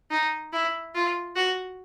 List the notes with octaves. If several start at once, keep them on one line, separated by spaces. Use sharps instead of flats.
D#4
E4
F4
F#4